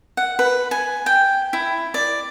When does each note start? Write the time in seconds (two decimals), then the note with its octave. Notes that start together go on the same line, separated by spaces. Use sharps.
0.17 F#5
0.39 B4
0.71 G#5
1.06 G5
1.53 E4
1.94 D5